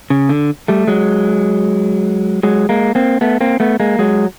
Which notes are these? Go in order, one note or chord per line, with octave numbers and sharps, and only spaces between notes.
C#3
D3
G3 A3
F#3 G#3
F#3 G#3
G#3 A#3
A#3 C4
A3 B3
A#3 C4
A3 B3
G#3 A#3
F#3 G#3